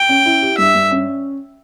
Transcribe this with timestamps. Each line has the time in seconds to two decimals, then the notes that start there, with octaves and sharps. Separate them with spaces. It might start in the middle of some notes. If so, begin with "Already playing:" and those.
Already playing: G5
0.09 C#4
0.26 E4
0.42 G4
0.58 G2 E5
0.75 G2
0.91 C#4